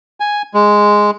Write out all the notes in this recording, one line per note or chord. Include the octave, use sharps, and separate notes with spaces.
G#5
G#3